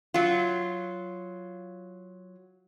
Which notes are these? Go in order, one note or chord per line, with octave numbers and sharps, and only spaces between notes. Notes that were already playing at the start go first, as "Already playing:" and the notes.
F#3 F4